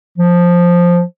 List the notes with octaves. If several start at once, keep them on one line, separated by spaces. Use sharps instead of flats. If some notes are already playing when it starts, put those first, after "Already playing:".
F3